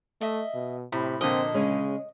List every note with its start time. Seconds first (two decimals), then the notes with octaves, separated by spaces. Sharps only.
0.21 A3 D#5 E5
0.54 B2
0.92 A2 C3 B5
1.21 A#2 D3 F3 C4 D#5
1.54 C#3 G#3 C#4 C#5